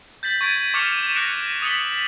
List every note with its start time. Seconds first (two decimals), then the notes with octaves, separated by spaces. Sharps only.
0.23 G6 A6 B6 F#7
0.41 C#6 G#6 A6 B6 D7 D#7
0.74 C#6 D6 F6 C#7 E7 F7
1.15 D6 F#6 A#6 C#7 D7
1.62 D#6 A6 B6 C#7 F#7 G7